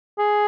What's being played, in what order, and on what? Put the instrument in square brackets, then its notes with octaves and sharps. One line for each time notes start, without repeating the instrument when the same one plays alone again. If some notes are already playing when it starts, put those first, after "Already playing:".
[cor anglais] G#4